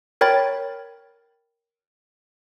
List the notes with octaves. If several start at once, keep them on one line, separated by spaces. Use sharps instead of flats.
A#4 C#5 G5 B5 A6